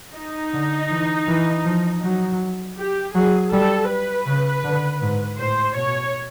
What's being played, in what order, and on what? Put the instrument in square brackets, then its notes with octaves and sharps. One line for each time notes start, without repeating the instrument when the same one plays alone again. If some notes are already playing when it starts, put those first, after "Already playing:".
[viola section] D#4
[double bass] D3
E3
E3
F3
F#3
[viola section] G4
[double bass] F#3 [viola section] G#4
[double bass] G3 [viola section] A4
[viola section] B4
[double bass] C#3
D3
G#2
[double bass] A2 [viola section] C5
[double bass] B2 [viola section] C#5